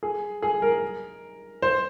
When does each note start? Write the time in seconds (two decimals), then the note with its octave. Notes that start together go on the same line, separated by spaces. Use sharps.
0.03 G#4
0.42 G#4
0.62 A#4
1.62 C5